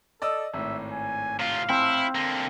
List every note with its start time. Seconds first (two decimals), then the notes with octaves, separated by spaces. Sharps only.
0.22 A4 D5 D#5 E6
0.54 G#1 A2 E5
0.92 G#5
1.40 C3 F4 F5
1.69 C4 E4 A5
2.15 D3 A#3